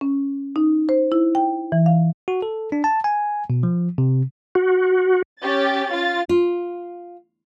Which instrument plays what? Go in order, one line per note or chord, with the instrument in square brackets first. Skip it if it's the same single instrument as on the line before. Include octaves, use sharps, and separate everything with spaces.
[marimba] C#4
D#4
C5
E4
G5
E3
F5
[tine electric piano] F#4
A4
D4
A5
G#5
B2
F3
C3
[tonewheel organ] F#4
[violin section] C#4 G4 A6
F4 A6
[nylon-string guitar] F4